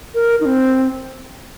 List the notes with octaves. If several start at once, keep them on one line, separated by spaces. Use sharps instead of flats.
A#4
D#4
C4